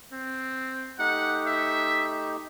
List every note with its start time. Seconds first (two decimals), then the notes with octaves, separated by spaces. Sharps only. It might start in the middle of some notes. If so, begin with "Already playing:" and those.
0.12 C4
0.99 A3 D#4 G4 F#5
1.47 E5